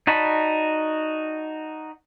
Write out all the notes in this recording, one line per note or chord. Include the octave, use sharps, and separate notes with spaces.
D#4 F#4 D5 A5 B5